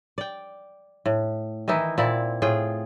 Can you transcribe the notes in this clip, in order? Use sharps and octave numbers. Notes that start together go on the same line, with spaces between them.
D5 G5
A2
D#3 E3 D#4 E4
A#2 C4 E4 D5
A2 F4 G#4 G5